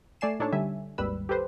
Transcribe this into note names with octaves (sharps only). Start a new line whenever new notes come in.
A3 D5 G#5 C7 E7
A#2 D4 D#4 A4 C#5 A5
D3 G3 E5 G#5
G#1 D#2 G3 B4 B5 E6
G4 A4 B4 C5